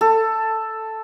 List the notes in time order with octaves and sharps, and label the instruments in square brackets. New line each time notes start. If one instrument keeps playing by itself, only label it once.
[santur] A4